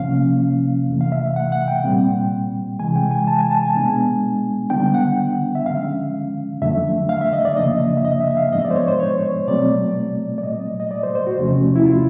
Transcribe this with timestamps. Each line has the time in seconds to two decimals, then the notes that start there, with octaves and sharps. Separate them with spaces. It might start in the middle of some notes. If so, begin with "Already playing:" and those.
Already playing: C3 F3 A#3 C#4 F5
0.88 F2 C3 E3 A3
1.01 F5
1.12 E5
1.36 F#5
1.52 F#5
1.68 G5
1.84 A#2 G3 C4
2.79 C3 E3 G#3 G#5
2.96 G5
3.11 G#5
3.27 A5
3.39 G#5
3.51 A5
3.63 G#5
3.75 B2 G#3 B3 D4
4.70 D3 G3 B3 D4 G5
4.94 F#5
5.55 E5
5.66 D3 F3 G#3 C#4 F5
6.62 F2 D3 F#3 A3 D4 E5
7.09 F5
7.21 E5
7.33 D#5
7.45 D5
7.57 F#2 C#3 F3 A#3 D4 D#5
7.97 E5
8.05 D#5
8.21 E5
8.31 E5
8.37 F5
8.52 G#2 F3 G#3 B3 D4 D#5
8.65 D5
8.70 C5
8.76 C#5
8.88 C5
9.00 C#5
9.47 B2 F#3 A3 C4 D5
10.38 D5
10.43 A#2 F#3 A3 D#5
10.80 D#5
10.91 D5
11.03 C5
11.15 C5
11.27 F#4
11.39 E2 C3 F3 A3 C#4
11.76 E4
11.86 F4